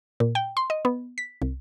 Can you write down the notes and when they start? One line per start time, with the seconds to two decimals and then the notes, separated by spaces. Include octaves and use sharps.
0.20 A#2
0.35 G5
0.57 C6
0.70 D#5
0.85 B3
1.18 B6
1.42 C2